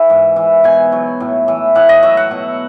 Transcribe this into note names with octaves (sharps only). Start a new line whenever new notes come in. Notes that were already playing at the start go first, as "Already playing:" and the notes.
Already playing: E3
G#2
E3
B2 G#5
F#3
A2
E3
A2 F#5
D#5
F#3 E5
F#5
B2